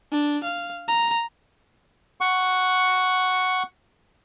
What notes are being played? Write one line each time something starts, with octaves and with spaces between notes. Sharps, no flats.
D4
F5
A#5
F#5 C#6